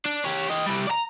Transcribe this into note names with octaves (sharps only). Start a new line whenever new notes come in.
D4
G4 C#5
G4 D#5
C3 G3
D5 A#5